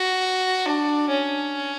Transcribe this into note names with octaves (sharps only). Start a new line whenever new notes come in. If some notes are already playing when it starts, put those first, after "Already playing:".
Already playing: F#4
D4
C#4